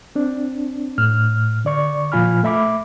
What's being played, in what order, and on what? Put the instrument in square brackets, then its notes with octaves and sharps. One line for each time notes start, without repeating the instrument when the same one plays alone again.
[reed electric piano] C4 D4
A2 F6
D3 D5 C#6
A#2 F3 F4 G#5 B5 F6
A3 E5 B5 D6